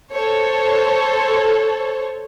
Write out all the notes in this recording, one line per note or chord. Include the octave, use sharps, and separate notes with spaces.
A4 C5 C#5